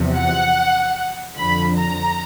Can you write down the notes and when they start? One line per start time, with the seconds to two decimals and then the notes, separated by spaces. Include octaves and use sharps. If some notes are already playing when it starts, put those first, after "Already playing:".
Already playing: E2 C3 F3
0.15 F#5
1.37 F2 D3 F3 B5
1.78 A#5